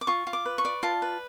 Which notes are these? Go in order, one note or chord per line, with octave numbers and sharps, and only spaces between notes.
D6
F4 C#6
F4
D6
B4
C#6
D5
F4 A5
B4